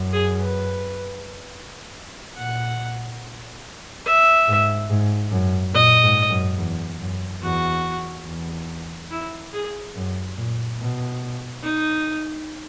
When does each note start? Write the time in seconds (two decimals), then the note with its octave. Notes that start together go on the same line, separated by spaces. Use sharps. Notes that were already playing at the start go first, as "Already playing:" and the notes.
Already playing: F#2
0.13 G#4
0.41 B4
2.36 A#2 F#5
4.05 E5
4.48 G#2
4.90 G#2
5.32 F#2
5.74 A#2 D#5
6.03 G#2
6.30 F#2
6.58 E2
7.00 F#2
7.43 E2 F#4
8.27 E2
9.11 E4
9.53 G#4
9.96 F#2
10.37 A#2
10.79 B2
11.63 D#4